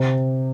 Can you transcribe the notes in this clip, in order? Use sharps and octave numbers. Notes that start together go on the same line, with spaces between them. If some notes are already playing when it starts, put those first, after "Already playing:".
Already playing: C3